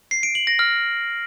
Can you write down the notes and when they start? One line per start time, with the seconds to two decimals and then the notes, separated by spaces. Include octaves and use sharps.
0.11 C7
0.23 D7
0.35 F#7
0.47 A#6
0.59 F6